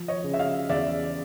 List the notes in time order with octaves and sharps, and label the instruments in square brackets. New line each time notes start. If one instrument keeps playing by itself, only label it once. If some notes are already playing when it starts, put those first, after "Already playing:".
Already playing: [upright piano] F3
[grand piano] C#5 D#5
[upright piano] C#3
[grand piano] E5
D#5 F5
[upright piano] E2 [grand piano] D5 E5